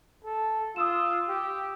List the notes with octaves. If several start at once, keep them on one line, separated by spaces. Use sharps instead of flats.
A4
F4 D#6 E6 E7
G4